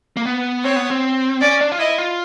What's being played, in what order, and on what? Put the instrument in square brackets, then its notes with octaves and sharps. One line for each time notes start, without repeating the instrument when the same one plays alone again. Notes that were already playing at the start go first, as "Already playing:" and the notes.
[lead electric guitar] A#3
B3
[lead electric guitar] C4 [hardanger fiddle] C#5
[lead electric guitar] B3
C4
[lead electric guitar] C#4 [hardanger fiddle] D5
[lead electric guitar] D4
F4
[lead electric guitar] E4 [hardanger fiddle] D#5
[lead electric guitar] F4